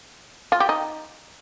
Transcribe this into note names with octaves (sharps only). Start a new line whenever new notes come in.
F4
G4
D#4